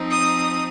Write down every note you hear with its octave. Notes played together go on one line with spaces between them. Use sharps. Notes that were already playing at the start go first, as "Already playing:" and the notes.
Already playing: F3 C4 D#4
D#6